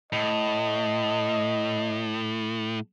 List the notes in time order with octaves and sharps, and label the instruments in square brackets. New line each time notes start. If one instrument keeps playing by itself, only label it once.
[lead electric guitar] A2 [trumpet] D#5